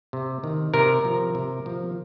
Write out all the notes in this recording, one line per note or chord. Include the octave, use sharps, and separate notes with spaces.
C3
D#3
C3 A#4
F3
C3
F3